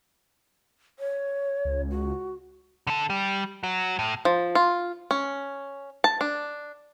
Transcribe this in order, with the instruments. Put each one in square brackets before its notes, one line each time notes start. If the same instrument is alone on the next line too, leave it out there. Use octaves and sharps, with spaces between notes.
[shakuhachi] C#5
[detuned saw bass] C#2
[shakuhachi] F#4
[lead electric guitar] D3 A4
G3
F#3
A2
[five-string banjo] F3
F4
C#4
A5
D4